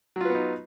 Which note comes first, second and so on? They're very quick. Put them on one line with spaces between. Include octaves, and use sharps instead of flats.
F#3 F4 B4 B3 D#4